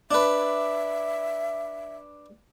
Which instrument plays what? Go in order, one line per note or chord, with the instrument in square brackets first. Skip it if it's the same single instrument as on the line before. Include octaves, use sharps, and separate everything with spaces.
[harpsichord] D4 B4 [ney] E5